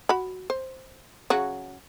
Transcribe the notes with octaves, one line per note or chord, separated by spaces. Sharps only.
F#4 B5
C5
C#3 F#3 F#4